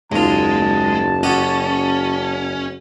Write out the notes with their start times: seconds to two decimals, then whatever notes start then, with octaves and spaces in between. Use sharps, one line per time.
0.12 F#1 D#2 G#3 F4 A5
1.23 C#4 F#4 G4 D#5